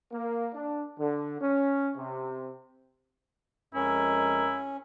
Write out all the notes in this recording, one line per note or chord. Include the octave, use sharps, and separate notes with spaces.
A#3
D4
D3
C#4
C3
F2 G#3 C#4 E4 A#4